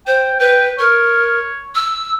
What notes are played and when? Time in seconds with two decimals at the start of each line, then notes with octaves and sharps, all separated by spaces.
0.07 C5 G5
0.39 B4 G5
0.79 A#4 C#5
1.75 E6